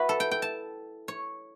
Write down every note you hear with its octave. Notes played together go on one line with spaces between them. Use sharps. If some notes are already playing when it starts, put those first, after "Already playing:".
Already playing: E4 F#4 B4
A4
G5
G5
A5
C#5